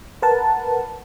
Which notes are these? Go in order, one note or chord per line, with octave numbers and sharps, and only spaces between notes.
A#4 B4 F#5 A5